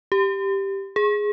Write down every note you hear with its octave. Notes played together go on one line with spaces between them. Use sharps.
G4
G#4